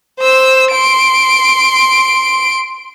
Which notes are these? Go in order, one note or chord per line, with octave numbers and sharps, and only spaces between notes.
C5 E6
C6 D7